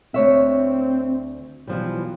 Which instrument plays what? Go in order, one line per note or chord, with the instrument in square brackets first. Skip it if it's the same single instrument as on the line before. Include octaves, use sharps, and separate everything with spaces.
[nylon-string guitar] D2 C#5 E5 [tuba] C4
[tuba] B1 [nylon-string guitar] E3 F3 G3